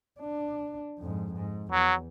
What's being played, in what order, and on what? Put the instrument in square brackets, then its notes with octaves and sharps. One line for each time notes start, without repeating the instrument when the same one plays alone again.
[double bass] D4
F2 G#2
G#2
[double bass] E2 [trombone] F#3